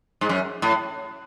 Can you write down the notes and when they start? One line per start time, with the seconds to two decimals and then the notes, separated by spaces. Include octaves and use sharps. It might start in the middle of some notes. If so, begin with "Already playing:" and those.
0.21 G#2
0.29 F#2
0.62 A2